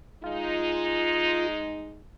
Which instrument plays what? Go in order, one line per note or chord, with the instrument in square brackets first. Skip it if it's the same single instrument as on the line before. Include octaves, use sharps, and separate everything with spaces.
[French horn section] G#3 D#4 [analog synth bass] F4